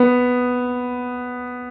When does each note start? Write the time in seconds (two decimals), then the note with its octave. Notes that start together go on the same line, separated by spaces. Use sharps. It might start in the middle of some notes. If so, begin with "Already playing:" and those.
Already playing: B3